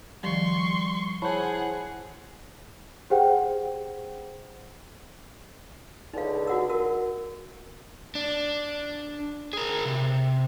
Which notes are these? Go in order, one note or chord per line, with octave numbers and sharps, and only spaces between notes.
D#3 F3 G3 C6 C#6
E4 G#4 C5 C#5 F#5 A5 B5
G4 G#4 C5 F#5 G5
C#2 D3 D#4 F5
F#4 F#5 E6
F#4 A#4 E6
D4
G#4 A#4
C3